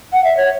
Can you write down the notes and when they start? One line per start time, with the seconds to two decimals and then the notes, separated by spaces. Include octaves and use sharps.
0.13 F#5
0.24 E5
0.37 C#5